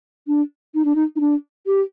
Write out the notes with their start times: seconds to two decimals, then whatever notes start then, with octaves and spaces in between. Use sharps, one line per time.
0.27 D4
0.75 D#4
0.85 D4
0.95 D#4
1.16 D#4
1.20 D4
1.67 G4